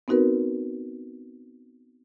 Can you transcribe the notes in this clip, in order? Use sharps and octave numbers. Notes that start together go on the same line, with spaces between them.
B3 C4 D#4 F#4 A#4 B4